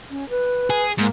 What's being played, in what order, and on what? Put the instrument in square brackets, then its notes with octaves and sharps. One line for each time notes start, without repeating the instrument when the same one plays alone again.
[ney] C#4
B4
[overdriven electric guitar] G#4
[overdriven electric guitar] G#2 [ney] A#3